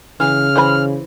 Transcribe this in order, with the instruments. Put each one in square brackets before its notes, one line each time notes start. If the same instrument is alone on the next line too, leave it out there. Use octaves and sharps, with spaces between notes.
[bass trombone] C#3 [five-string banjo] E3 [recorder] F6
[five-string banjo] E3 C5 B5